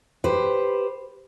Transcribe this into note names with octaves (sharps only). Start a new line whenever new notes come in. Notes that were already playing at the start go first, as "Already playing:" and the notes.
G4 B4 C5